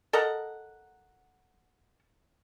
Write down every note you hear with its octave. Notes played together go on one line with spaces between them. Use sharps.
A4 A#4 D#5 F#5